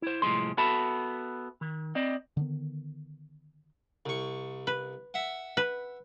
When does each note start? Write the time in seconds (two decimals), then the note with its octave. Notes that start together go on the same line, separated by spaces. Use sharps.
0.02 E4 C5
0.22 C2 A2 F3 G#3 C6
0.57 B3 F#4 A4 E5 A5 B5
1.61 D#3
1.95 C4 D5 D#5
2.37 D3 D#3 B3
4.06 C2 C#6
4.67 B4
5.14 E5 F#5
5.57 B4